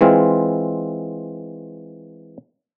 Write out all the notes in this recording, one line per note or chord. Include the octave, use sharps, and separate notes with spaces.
E3 G#3 C4 F4